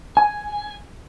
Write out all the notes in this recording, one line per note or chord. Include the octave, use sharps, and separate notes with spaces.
G#5